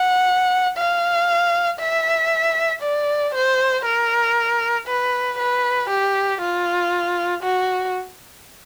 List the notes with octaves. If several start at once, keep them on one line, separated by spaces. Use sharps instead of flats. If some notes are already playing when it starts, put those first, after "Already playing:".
Already playing: F#5
F5
E5
D5
C5
A#4
B4
B4
G4
F4
F#4